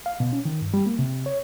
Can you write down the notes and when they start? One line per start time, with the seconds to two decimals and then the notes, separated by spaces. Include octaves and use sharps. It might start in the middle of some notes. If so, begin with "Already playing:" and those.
0.06 F5
0.20 B2
0.33 C#4
0.45 D#3
0.62 G2
0.74 G3
0.86 A#3
0.99 C3
1.26 C#5